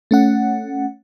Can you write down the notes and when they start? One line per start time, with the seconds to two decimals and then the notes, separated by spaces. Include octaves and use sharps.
0.11 A3 C#4 F#5